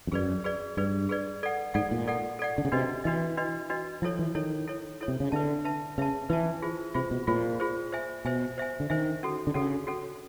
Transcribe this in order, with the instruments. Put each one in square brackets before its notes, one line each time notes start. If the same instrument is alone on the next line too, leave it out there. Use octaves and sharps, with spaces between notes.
[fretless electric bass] F2
[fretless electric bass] F#2 [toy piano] G#4 B4 D5
[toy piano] G#4 B4 D5
[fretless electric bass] G2 [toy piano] G#4 B4 D5
[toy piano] G#4 B4 D5
A4 D5 F#5
[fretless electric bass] G#2 [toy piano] A4 D5 F#5
[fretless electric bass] A#2
[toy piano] A4 D5 F#5
A4 D5 F#5
[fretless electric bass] D3
C#3
[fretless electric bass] C3 [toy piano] D4 F#4 B4 D#5
[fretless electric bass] E3 [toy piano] D4 F#4 B4 D#5
[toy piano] D4 F#4 B4 D#5
D4 F#4 B4 D#5
[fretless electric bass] F3 [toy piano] E4 A4 C#5
[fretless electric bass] E3
[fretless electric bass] D#3 [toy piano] E4 A4 C#5
[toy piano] E4 A4 C#5
E4 A4 C#5
[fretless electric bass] C3
C#3
[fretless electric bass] D3 [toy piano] B4 E5 A5
[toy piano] B4 E5 A5
[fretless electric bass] C#3 [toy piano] B4 E5 A5
[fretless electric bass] E3 [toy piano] B4 E5 A5
[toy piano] F4 G#4 C5
[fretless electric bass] C3 [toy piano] F4 G#4 C5
[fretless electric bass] B2
[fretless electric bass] A#2 [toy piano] F4 G#4 C5
[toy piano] F4 G#4 C5
C5 E5 G#5
[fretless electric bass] B2 [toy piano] C5 E5 G#5
[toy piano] C5 E5 G#5
[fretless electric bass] D3
[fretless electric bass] D#3 [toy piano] C5 E5 G#5
[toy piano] C#4 F#4 A4
[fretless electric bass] D3
[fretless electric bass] C#3 [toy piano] C#4 F#4 A4
[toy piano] C#4 F#4 A4